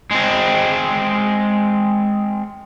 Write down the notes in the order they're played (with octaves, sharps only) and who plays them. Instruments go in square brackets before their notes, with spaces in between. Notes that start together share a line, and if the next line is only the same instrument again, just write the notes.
[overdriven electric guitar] G#3 C4